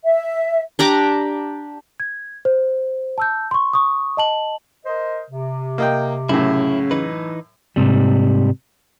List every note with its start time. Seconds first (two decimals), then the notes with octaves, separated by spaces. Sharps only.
0.05 E5
0.79 D4 G4 A#5 D6
2.00 G#6
2.45 C5
3.18 A5 E6 G6
3.51 C6 C#6
3.73 C#6 D#6
4.17 D#5 A5 F#7
4.85 A#4 C5 D#5
5.30 C3
5.78 A#3 D#5 G5
6.29 F#2 A2 C#3 E4
6.91 E3 D#4 B4
7.76 G#2 C3 G3